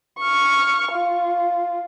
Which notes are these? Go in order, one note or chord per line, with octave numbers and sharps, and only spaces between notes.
C#6 F6
F4